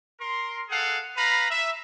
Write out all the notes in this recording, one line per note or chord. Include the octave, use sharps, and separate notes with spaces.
A#4 C6
G#4 A4 F5 F#5
B4 F5 A#5 B5
E5